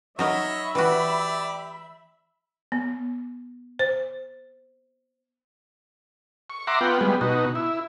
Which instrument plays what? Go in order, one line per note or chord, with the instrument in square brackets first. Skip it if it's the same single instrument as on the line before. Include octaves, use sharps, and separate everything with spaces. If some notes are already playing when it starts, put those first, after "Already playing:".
[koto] F#3 D#4 A#4 [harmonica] C#5 D#5 [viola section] E5 B5
[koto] E3 F#4 [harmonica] G4 D5
[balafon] B3
C5
[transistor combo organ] C#6
E5 F#5 A#5 C6 D6
B3 F4 F#5 G5
G3 G#3 B3
B2 D#4 F#4
E4